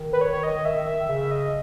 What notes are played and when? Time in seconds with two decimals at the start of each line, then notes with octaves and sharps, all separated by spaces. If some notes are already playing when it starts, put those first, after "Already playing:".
Already playing: D#3
0.13 B4
0.21 C#5
0.33 C#5
0.43 D#5
0.65 E5
0.87 E5
1.08 C#3 E5
1.31 D#5